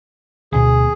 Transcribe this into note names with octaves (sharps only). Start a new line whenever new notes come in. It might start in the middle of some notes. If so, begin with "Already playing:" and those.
D2 B2 G#4